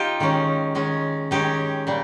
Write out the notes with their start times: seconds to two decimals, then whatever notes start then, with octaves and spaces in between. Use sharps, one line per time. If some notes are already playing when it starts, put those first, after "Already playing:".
Already playing: D#4 F4 G4
0.20 D#3 G#3 C#4
0.75 D#3 G#3 C#4
1.31 D#3 G#3 C#4 G4
1.87 A#2 G3